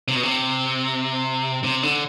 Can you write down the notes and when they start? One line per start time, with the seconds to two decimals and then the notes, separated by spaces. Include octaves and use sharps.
0.08 C3
0.15 B2
0.23 C3
1.64 C3
1.83 D3